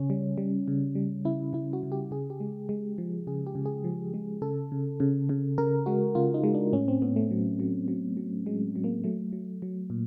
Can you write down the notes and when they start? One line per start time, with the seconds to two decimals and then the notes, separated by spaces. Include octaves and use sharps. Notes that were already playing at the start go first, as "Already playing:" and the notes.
Already playing: C#3 C#4
0.10 G3
0.38 G3
0.68 C#3
0.95 G3
1.25 C#3 E4
1.53 C#3 E4
1.73 F#4
1.83 C#3
1.92 G4
2.11 C#3 G#4
2.30 G4
2.40 G#3
2.69 G#3
2.98 F3
3.27 C#3 G#4
3.47 G4
3.55 C#3
3.66 G#4
3.84 F3
4.14 G#3
4.42 C#3 A4
4.72 C#3
5.00 C#3
5.29 C#3
5.58 C#3 A#4
5.86 G#3 F#4
6.15 C#3 F4
6.34 D#4
6.44 G#3
6.54 D4
6.73 A2 C#4
6.88 C4
7.02 A2 B3
7.16 A3
7.31 F#3
7.60 F#3
7.88 F#3
8.17 F#3
8.46 F#3 G#3
8.76 F#3
8.84 A#3
9.04 F#3 A3
9.32 F#3
9.62 F#3
9.90 A#2